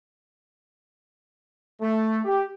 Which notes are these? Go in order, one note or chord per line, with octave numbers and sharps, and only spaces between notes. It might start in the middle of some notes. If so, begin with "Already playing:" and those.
A3
G4